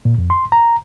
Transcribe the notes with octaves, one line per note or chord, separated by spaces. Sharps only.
A#2
F2
C6
A#5